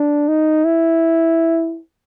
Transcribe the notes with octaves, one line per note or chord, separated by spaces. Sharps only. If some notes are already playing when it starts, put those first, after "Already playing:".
Already playing: D4
D#4
E4